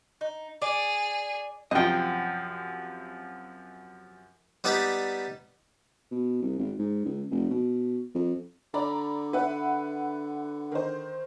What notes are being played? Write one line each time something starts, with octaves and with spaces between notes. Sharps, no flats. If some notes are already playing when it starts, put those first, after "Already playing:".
D#4
G#4 D5
F#2 C3 F3 D#5 G5
G3 B3 D#4 G4 D5
B2
C2
G#1
G#2
C#2
F1
B2
F2
D3 D5 A#5 B5
B4 E5 F#5
D#3 C5